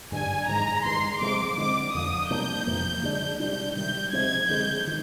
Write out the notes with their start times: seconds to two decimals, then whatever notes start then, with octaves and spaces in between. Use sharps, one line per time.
0.12 G2 D3 G3 D4 G#5
0.48 G#2 D#3 G#3 A#5
0.85 G2 D#3 G#3 C6
1.21 C3 F3 G#3 C4 D6
1.57 D3 G#3 C4 D6
1.93 F2 D3 F3 D#6
2.30 C3 G3 A#3 D4 G6
2.67 F2 C3 F3 A#3
3.03 D3 G#3 D4
3.40 C3 G3 D4 G6
3.76 C3 D#3 G3 G6
4.12 C3 F3 G#3 C4 G#6
4.49 D3 G#3 C4 G6
4.87 D#3